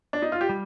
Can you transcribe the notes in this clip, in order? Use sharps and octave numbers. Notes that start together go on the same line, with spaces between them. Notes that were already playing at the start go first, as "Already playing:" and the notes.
D4
D#4
F4
G4
G3